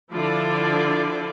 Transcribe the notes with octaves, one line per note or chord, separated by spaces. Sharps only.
D3 F3 E4 F4 D5